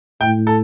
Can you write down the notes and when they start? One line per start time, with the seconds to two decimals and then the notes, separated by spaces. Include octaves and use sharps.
0.21 A2 G5
0.47 A4